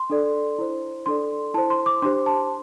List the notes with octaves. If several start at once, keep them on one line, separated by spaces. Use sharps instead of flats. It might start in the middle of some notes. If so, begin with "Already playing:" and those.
Already playing: C6
D4 A4 D5
E4 C5
D4 A4 D5 C6
E4 C5 A5
C6
D6
D4 G4 C5 C6
A5